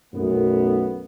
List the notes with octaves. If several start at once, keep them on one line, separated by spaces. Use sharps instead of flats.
B1 F#2 A3 B3